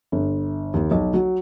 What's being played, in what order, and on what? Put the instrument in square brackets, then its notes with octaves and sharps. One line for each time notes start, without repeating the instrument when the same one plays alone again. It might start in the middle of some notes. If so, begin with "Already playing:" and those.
[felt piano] G1
D#2
B1
F#3